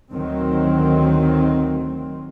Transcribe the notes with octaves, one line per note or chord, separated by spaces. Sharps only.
D2 D#3 F#3 C4